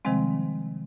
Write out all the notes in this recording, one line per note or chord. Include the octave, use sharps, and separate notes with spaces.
C3 D#3 F3 G3 G#3 C4